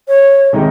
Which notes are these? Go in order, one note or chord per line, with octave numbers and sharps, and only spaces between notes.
C#5
C3 D#3 G#3 D#4 G4